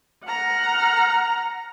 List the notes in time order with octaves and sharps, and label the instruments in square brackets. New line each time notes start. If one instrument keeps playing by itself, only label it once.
[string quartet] F#5 A#5 F6